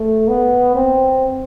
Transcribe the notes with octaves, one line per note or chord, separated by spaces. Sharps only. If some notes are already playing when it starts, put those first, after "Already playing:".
Already playing: A3
B3
C4